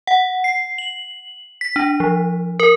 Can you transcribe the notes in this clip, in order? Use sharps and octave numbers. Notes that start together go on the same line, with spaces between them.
F#5
C7
F#7
B6
D4
F3
A#4